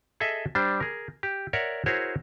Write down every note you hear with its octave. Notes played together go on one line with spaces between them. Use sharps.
G#4 A4 D#5 E5
G3 D4 C5
G#4 A#4
G4
A#4 C#5 D5 E5 F#5
E4 F#4 G#4 A#4 C5 C#5